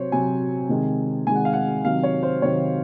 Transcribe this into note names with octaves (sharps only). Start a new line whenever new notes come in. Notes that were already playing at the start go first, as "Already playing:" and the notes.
Already playing: C3 F#3 C5 C#5
C3 F#3 G#5
C3 D#3 G#3
C3 D#3 G#3 G#5
F#5
F5
F#5
C3 D#3 F#3 F5
C#5
C5
C3 D#3 F#3 C#5